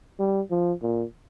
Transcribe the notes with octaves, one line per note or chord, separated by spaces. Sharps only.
G3
F3
A#2